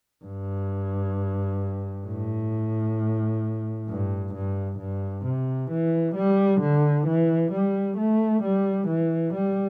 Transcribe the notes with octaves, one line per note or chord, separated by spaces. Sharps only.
G2
A2
G2
G2
G2
C3
E3
G3
D3
E3
G3
A3
G3
E3
G3